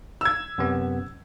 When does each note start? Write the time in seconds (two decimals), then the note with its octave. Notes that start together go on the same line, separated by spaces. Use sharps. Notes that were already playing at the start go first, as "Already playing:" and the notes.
0.21 E6 G#6
0.58 F#2 C3 B3